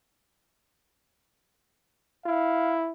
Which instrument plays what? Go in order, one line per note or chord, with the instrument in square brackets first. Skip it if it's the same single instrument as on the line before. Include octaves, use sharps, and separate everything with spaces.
[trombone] E4 [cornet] F5